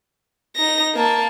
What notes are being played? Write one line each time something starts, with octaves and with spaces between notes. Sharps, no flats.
D#4 A#6
A#3 A5